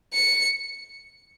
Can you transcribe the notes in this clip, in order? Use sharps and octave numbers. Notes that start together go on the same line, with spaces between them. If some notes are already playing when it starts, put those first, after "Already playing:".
C#7